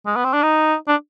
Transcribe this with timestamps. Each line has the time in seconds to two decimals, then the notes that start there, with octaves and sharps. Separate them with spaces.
0.07 G#3
0.16 B3
0.25 C4
0.34 D4
0.43 D#4
0.88 D4